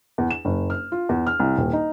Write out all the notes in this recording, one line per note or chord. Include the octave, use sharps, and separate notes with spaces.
E2
E7
F#1
F6
F4
E2
F6
C2
D#1
D#4